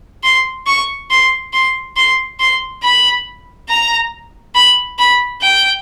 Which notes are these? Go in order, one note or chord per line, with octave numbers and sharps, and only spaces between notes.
C6
C#6
C6
C6
C6
C6
B5
A#5
B5
B5
G5